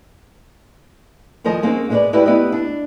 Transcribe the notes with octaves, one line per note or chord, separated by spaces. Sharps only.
D#2 F3 A#4 C5 D#5 G#5
G#3 A#3 C4 C#4 D#4
G#3 A#3 C#4 F#4 B4 D5
E4 F#4 G4 B4 D5 F5
B3 E4 G4 D5 D#5
D4